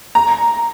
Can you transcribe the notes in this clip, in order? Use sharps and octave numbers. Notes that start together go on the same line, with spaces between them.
A#5